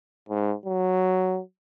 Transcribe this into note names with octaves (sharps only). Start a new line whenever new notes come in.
G#2
F#3